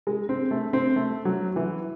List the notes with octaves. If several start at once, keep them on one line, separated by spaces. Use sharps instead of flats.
G#3
C4
A3
C4
A3
F#3
E3